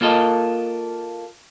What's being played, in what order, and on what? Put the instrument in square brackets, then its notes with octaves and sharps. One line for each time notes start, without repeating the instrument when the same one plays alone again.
[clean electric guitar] A#3 F4 A4 D#5